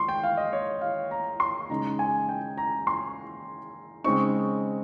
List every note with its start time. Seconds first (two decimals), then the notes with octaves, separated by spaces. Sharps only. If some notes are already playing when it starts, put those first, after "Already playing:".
Already playing: D#3 G#3 C6 C#6
0.08 G5
0.23 F5
0.37 D#5
0.53 C#5
0.81 F5
1.11 A#5
1.40 C6
1.70 C#3 G#3 D#4 A#5
1.99 G#5
2.29 G5
2.58 A#5
2.87 C6
4.04 C#3 G#3 C4 D#4 C#6